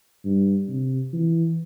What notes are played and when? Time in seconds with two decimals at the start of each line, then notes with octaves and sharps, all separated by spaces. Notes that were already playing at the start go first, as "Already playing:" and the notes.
0.25 G2
0.69 C3
1.13 E3